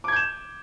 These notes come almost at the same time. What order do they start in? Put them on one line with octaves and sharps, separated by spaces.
D6 G#6 G6 E7